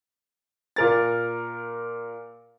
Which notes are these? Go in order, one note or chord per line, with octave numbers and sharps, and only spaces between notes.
A#2 A#4 A6